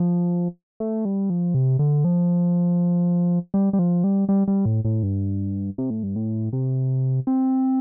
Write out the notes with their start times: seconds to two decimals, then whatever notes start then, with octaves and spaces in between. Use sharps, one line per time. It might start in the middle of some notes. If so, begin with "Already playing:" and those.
Already playing: F3
0.80 A3
1.05 G3
1.30 F3
1.54 C3
1.79 D3
2.05 F3
3.54 G3
3.73 G3
3.79 F3
4.04 G3
4.29 G3
4.48 G3
4.66 A2
4.85 A2
5.03 G2
5.78 C3
5.90 A2
6.03 G2
6.16 A2
6.53 C3
7.27 C4